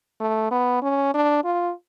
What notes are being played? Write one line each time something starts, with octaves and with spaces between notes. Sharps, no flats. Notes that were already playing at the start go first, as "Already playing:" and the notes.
A3
B3
C#4
D4
F4